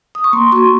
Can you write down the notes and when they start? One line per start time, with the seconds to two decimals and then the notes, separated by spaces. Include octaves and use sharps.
0.15 D#6
0.24 C#6
0.33 A#3 C6
0.52 F#4 C#6